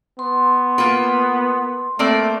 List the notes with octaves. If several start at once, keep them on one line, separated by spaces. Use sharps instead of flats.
B3 C6
A#3 F4 B4
A3 A#3 C4 D5